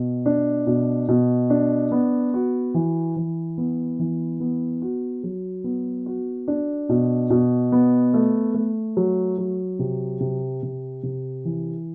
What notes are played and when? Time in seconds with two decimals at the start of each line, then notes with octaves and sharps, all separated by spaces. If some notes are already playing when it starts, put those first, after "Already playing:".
Already playing: B2
0.26 D4
0.67 B2
1.08 B2
1.50 D4
1.91 B3
2.34 F#4
2.74 E3
3.16 E3
3.58 B3
3.99 E3
4.40 B3
4.82 F#4
5.23 F#3
5.64 B3
6.06 F#4
6.48 D4
6.89 B2
7.30 B2
7.72 B3
8.14 A3
8.54 A3
8.97 F#3
9.38 F#3
9.79 C3
10.20 C3
10.63 C3
11.03 C3
11.45 E3